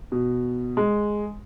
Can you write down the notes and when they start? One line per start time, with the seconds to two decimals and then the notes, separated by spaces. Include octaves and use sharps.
0.12 B2
0.77 G#3